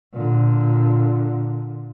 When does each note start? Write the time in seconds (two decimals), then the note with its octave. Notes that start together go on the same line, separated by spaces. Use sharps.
0.13 A#2 D3